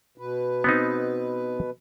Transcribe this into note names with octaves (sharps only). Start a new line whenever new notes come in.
B2 B4
B3 C4 D#4